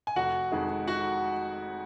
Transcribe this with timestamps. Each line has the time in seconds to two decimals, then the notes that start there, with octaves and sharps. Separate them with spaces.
0.07 G#5
0.16 F1 F#4 F#5
0.52 F2 D#3 G#3
0.87 F#4 F#5